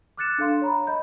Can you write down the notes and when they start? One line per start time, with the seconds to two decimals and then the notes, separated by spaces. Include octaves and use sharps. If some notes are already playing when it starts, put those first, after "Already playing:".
0.17 D6 F6 F#6 A6 C#7 E7
0.38 D4 A4 F5 C6
0.62 C#5 A#5 B5
0.87 D#5 B5 G6